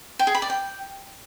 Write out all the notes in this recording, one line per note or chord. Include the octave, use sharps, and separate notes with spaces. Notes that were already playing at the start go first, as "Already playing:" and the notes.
G5
G#4
B5
D5
G5